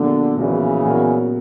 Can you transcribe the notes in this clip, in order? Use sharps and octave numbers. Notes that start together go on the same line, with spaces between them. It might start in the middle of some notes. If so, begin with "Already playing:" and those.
Already playing: A#1 A#2 D3 F#3 B3
A#1 A#2 C#3 E3 F#3 B3
A#2 F#3 B3 F#4 A#4